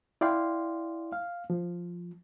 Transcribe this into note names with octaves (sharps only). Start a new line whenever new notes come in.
E4 D5 F5 G5 C6
F5
F3